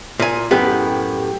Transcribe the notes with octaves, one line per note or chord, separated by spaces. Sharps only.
A#2 G#5
F#2 A2 B3 G4